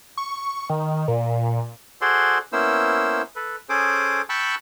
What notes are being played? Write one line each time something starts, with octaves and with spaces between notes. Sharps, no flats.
C#6
D#3
A#2
F#4 G#4 A4 C5 D5 C6
A#3 B3 C#4 E4 C5 E6
A4 B4
C#4 G#4 A4 C5 D6 D#6
G5 A5 B5 C#6 E6 F#6